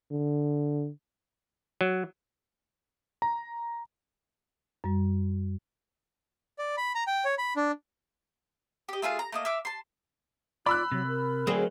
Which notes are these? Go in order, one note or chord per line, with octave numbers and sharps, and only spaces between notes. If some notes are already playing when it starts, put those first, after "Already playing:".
D3
F#3
A#5
F#2 G3
D5
B5
A#5
G5
C#5
B5
D4
G4 D#5
A3 F4 G#4 F5
A#5
A3 A#3 D#5
E5 F5 D6
A5 C6
F4 D5 B5 E6 F#6
C3 F#3
A#4
D3 F#3 A3 C4 G#4